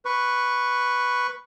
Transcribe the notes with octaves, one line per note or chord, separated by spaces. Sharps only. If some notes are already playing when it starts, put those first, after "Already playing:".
B4 C#6